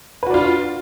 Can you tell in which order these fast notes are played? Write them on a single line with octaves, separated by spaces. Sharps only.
B4 F#4 D4 F4